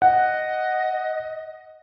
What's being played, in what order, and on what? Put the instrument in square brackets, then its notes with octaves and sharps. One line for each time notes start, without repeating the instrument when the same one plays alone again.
[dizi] D#5 [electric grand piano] F#5